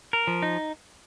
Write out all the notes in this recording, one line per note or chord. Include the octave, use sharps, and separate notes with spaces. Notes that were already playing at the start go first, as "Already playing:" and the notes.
A#4
F3
D#4